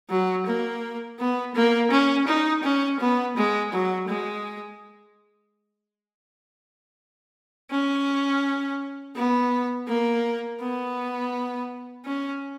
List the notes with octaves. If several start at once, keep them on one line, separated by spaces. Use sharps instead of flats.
F#3
A#3
B3
A#3
C#4
D#4
C#4
B3
G#3
F#3
G#3
C#4
B3
A#3
B3
C#4